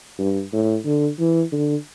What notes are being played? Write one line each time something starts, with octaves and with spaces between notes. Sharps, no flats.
G2
A2
D3
E3
D3